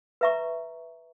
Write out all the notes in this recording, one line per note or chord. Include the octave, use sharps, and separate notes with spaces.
B4 E5 A#5 C#6